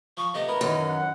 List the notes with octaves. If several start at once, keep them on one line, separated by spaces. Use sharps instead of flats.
F3 C#6
C3 A3 B3 D#5
B3 E4 A#4 B4
F#2 D#3 E3 C#4
F#5